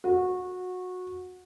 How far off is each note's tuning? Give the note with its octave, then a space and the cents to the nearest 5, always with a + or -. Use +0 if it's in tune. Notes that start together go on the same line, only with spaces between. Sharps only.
F#4 -20